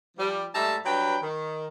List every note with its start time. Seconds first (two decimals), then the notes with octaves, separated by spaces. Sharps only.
0.17 F3 G3
0.55 G#2 G3 A3 E5 A5 A#5
0.85 G2 F#3 B4 G5
1.22 D#3